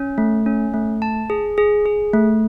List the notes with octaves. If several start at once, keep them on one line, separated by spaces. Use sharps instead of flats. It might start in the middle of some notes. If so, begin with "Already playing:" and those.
Already playing: C#4
A3
C#4
A3
A5
G#4
G#4
G#4
A3